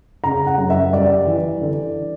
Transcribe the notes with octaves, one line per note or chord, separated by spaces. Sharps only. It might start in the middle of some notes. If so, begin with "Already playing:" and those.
C#3 A#5
F#5
F#2
E5
G3 D5
E3
D3